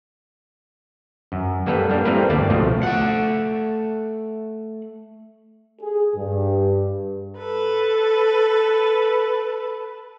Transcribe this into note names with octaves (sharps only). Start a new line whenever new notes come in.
F#2
G3 A#3 B3 A4 B4
G3 A#3 D4
G3 A3 C4 E4 A#4 B4
D2 G2 A#3 B3 D5 A5
C#2 B2 F3 A3
A3 F#5
G#4
G2
A4 B4